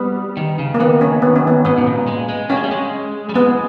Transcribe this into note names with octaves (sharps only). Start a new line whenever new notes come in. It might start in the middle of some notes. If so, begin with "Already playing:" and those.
Already playing: G3 B3
D#3
C#3
A#3
D#3 B3
C#4
B3
C#4
B3
G#2 B3
B2
A#2
G#3
G#3
A#3 C#4
G#3
G3
G#3
G3
G#3 B3